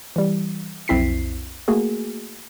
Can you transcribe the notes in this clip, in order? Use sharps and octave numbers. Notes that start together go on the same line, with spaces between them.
E3 G3
B1 F2 C4 E4 B6 C7
A3 A#3 F#4 G#4